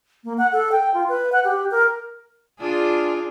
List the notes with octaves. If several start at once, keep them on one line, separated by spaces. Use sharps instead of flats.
A#3
F#5
A4
G5
F4
B4
F#5
G4
A#4
D4 F4 G#4